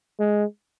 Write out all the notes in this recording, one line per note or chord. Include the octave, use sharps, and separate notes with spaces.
G#3